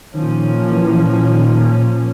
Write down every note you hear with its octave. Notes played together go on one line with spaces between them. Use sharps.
A#2 D#3 F3 A#3 C#4
E3
E3
D#3